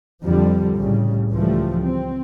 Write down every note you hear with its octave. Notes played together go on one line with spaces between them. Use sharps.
F2 D3 F3 G3
C2 A2 C#3 G3
C#2 E3 F3 G3 A3
C4